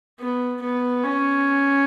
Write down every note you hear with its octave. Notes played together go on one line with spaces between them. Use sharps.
B3
B3
C#4